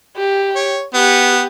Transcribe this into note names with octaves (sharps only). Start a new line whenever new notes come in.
G4
C#5
B3 G4